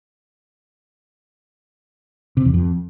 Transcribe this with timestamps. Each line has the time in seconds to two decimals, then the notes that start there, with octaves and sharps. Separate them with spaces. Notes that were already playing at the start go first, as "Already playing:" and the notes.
2.37 C3
2.45 E2
2.54 F2